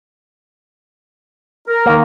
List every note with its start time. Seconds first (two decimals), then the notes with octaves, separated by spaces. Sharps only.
1.67 A#4
1.86 D#3 A#3